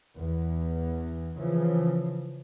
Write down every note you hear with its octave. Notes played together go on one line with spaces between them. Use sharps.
E2
C#3 E3 F3